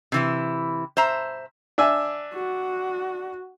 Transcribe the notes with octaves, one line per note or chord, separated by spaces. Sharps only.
C3 E3 E4
C5 E5 A#5
D4 E5 G#5
F#4